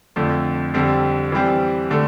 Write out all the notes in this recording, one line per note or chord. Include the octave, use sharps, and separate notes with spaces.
F2 D3 F3 A3
F2 D3 G3 C4
E3 G3 C4
D3 A3